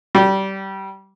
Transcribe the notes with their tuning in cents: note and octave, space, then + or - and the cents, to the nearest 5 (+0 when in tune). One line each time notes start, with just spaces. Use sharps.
G3 -20